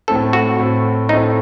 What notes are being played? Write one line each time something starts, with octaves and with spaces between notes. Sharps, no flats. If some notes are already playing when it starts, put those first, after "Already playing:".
A2 A3 C4 A4
F#4
A2 A3 C4
A2 A3 C4 D#4